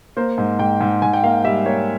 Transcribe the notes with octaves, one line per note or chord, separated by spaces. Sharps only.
A#3 C5
G#2
G#2 G5
G#2
G#2 G#5
G5
A#3 F5
G3 E5
A#3 C#5